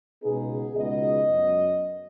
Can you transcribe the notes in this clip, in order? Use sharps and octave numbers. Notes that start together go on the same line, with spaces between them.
C#2 B2 B3 D#4 G#4
C#2 B2 B3 D#4 D#5
F#2 F#3 B3